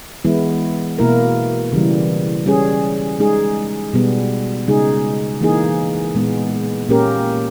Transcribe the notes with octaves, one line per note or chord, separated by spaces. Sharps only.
E3 G#3 B3 E4
B2 A#3 E4 A#4
C#3 E3 G3
G3 C#4 G#4
G#3 D#4 G#4
B2 G3 B3
C#3 G#3 D#4 G#4
E3 A#3 D#4 G#4
A#2 G#3 B3
A#2 A#3 C#4 G4 A#4